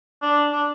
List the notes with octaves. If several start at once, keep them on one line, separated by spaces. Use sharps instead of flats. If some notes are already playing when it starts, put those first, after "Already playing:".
D4
D4